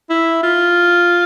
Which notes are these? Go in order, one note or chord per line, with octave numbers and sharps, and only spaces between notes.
E4
F4